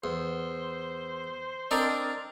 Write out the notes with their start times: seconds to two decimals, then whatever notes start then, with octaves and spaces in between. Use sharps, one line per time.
0.04 E2 C5
1.71 C4 D4 D#4 A#4 D5